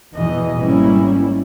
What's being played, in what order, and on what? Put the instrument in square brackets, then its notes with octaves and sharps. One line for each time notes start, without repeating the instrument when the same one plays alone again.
[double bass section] E2 B2 E3 [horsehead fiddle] D#5
[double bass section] G#1 G3 C#4 [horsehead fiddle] A#3 E4